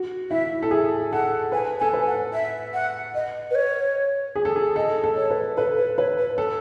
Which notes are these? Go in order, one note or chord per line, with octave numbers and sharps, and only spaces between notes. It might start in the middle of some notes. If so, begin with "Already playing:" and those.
Already playing: F#4
E4 E5
A4
G#4
A4 F#5
B4 G#5
A4 G#5
B4
F#5
E5
F#5
D#5
B4
C#5
G#4
A4
G#4
A4 D#5
A4
C#5
B4
A4 B4
B4
B4 C#5
B4
A4